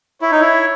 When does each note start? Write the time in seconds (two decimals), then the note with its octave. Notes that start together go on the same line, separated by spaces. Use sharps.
0.21 E4 C#5
0.32 D#4
0.41 E4